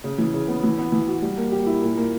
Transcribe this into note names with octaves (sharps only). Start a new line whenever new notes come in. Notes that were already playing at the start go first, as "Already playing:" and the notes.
C#3
E3
C#3
B3
E3
B3
E3
F#4
G3
A#3
G4
E4
A#2
A#3